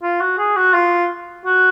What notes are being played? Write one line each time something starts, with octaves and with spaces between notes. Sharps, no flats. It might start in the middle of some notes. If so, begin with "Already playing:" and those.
F4
F#4
G#4
F#4
F4
F#4